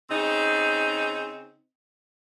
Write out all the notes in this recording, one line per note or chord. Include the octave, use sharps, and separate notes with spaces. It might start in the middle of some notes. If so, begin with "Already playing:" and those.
C#3 C4 D#4